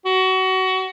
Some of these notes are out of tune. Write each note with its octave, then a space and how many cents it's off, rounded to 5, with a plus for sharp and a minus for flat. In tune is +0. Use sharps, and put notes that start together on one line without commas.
F#4 +25